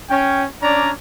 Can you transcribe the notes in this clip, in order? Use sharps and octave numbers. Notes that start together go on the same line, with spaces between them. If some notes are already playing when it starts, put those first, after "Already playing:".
C#4 G5
C#4 D4 D5 A#5